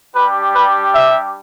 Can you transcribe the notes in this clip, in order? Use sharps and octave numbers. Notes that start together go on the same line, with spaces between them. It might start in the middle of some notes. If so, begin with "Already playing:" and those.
G3 D4 G4 B4
B4
E5